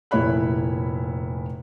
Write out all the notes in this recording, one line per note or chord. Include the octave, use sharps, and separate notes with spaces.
F1 A#2 E4 C#5 B5 F#6